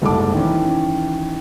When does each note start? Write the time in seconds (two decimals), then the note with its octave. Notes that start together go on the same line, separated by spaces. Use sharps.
0.02 F#1 C2 G#2 A4 A5 D6
0.33 D#3 E3 C#4